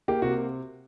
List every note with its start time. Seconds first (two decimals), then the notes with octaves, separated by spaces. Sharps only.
0.08 A#3 G4
0.22 C3 F#4